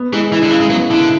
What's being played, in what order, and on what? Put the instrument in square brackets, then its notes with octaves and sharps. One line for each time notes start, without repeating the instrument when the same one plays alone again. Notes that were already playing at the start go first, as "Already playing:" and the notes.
Already playing: [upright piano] B3
[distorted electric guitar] E3 [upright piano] G#3
[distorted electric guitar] E3 [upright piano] E4
[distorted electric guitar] D3
[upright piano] C#3 [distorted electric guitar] E3
[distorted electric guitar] G#3
[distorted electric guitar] F#3 [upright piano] B3
[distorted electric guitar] D3 [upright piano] E4